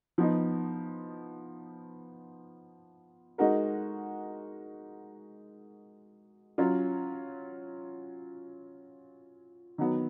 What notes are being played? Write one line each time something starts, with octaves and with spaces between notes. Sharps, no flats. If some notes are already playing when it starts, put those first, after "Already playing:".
F3 B3 D#4
G#3 D#4 F#4 A#4
F#3 C#4 F4
D#3 F#3 B3